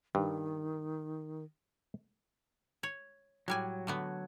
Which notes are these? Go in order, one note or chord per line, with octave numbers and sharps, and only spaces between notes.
G2 D#3
C#5
A2 F#3 G3 G#5
D3 A3 B3